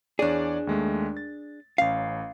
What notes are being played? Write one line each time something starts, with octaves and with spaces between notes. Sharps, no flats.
E2 D4 G#4 C#5 D5
D#2 G#3 A3
A6
A1 C#4 F5